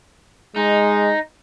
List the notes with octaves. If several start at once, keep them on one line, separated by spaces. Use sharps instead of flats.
G#3 D#4